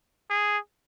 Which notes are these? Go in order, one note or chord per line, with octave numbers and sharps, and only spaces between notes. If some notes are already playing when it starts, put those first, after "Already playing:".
G#4